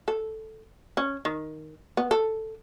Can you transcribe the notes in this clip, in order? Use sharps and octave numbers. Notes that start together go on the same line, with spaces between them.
A4
C#4
D#3
B3
A4